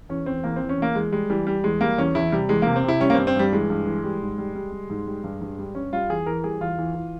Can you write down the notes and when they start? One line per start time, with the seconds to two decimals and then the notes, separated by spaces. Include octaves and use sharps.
0.09 E2 C#4
0.26 E2 C4
0.44 E2 A#3
0.56 C4
0.62 E2
0.69 C#4
0.78 E2 A#3
0.95 E2 G#3
1.12 G3 G#3
1.30 E3 G3
1.47 G3
1.64 E2 G#3
1.81 G3 A#3
1.98 E2 C#4
2.15 E2 E4
2.32 C3 G3
2.49 E2 G#3
2.62 C3 A#3
2.76 C4
2.84 C3 E4
3.01 G3 C#4
3.10 A#3
3.14 G2 C4
3.27 C4
3.35 G2 G3
3.52 E3 G#3
3.70 G2
3.87 E3
4.04 G3
4.21 G#2
4.38 G3
4.55 G3
4.72 G3
4.90 G#2
5.06 G3
5.24 G2
5.41 G2
5.59 G3
5.75 G2 C#4
5.93 G3 F4
6.09 E2 G#4
6.26 E3 A#4
6.44 G3 G#4
6.60 E2 F4
6.78 E3
6.95 E3